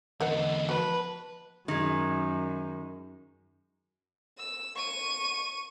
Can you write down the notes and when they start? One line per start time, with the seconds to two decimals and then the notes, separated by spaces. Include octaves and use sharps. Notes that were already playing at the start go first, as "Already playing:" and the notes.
0.20 E2 D3 A#4 B4 D#5 F#5
0.69 F#4 B4 A5
1.68 F#2 D#3 G#3
4.38 E6
4.76 C#6 D#7